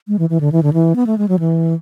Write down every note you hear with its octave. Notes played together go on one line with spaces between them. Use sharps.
G#3
E3
E3
D3
E3
D3
E3
B3
A3
G#3
F#3
E3